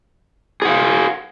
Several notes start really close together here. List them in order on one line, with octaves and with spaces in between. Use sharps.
G#4 F#5 F5